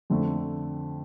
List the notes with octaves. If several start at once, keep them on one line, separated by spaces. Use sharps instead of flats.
F2 D3 A3 C4